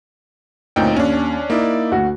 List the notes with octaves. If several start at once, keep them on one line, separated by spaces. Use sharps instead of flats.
D2 A#2 C4 D#4 C#5 G5
D#2 C#4 D4
A#3 D#4 E4 D5
D2 F#4